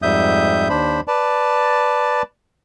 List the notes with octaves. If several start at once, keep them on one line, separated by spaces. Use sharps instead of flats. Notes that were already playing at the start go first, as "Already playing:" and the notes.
F2 G#2 G3 E5 D#6 G6
D#2 D4 C5 B5
B4 D5 A5